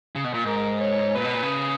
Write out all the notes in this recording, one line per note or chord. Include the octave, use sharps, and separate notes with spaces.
C#3
B2
A#2
G#2 A#4
C#5
A#2 B4
B2
A#2
C#3